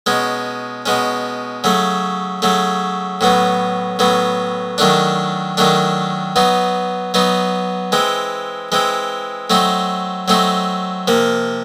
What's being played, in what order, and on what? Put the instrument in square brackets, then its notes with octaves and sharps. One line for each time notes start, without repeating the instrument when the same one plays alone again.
[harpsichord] B2 G#3 C#4
B2 G#3 C#4
C#3 F#3 A3
C#3 F#3 A3
A2 F#3 B3
A2 F#3 B3
D#3 F#3 A3 D4
D#3 F#3 A3 D4
F#3 B3 D#4
F#3 B3 D#4
E3 G#3 C4
E3 G#3 C4
F#3 A3 C4 D#4
F#3 A3 C4 D#4
C3 F3 A#3